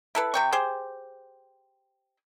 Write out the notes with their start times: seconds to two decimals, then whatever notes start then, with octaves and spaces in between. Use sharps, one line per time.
0.15 E4 A4 B4
0.34 C3 G5 C#6
0.52 G4 G#4 C5